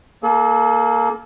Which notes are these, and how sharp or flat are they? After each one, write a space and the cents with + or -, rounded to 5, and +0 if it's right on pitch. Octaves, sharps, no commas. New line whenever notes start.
A#3 +0 A4 -40